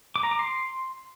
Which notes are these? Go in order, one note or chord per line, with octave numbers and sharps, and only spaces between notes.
D6
A#5
D6
C6